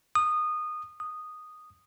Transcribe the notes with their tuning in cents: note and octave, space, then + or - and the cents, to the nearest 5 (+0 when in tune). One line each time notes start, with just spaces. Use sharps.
D#6 -20
D#6 -10